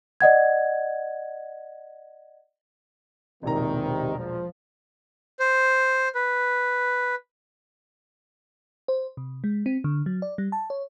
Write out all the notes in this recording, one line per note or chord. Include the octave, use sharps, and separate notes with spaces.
D5 D#5 F#5 G#6
E1 A#1 C3 D#3 A#5
F3
C5
B4
C5
C3
G#3
C4
D3
F#3
D5
G3
A5
C#5